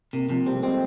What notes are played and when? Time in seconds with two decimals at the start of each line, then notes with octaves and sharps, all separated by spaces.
0.13 C3 A#3
0.29 C3 F3
0.46 G3 C4
0.55 A3
0.63 G#3 C4